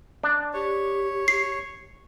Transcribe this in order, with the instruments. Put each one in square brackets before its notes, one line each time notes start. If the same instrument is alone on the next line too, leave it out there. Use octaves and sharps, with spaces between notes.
[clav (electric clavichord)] D4
[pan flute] G4 [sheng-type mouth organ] C#5
[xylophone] C7